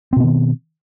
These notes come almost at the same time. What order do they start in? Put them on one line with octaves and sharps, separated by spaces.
C4 B2 B3 D#3